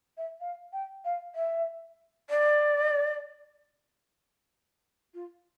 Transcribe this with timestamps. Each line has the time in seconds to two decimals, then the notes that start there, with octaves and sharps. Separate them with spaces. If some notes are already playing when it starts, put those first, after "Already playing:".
0.17 E5
0.40 F5
0.73 G5
1.04 F5
1.35 E5
2.30 D5
5.14 F4